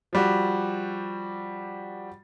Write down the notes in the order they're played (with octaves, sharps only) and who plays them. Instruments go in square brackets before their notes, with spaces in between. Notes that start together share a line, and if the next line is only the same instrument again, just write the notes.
[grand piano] F3 G3 F#4